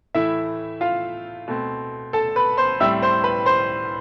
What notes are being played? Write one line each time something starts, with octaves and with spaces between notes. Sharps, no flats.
A2 E3 A3 E4 E5
F4 F5
B2 A3 C4
A4 A5
B4 B5
C5 C6
A2 G3 C4 E5 E6
C5 C6
B4 B5
C5 C6